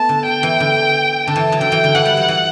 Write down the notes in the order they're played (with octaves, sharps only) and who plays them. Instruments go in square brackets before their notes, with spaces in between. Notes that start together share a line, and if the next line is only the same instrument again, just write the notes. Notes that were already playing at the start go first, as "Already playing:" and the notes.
Already playing: [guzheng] A3 B3 [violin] A5
[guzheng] D3
[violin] G5
[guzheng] E3
D3
[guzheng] D3 [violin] A5
[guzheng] E3
F#3
[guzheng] D3 [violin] G5
[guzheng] E3
D3
[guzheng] E3 [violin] F#5
[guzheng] G3
F#3
E3